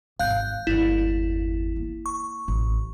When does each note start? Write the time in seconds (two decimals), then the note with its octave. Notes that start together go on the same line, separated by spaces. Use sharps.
0.19 G#1 F5 F#6 G6
0.67 G1 E2 E4
1.76 A#3
2.06 C#6
2.48 A1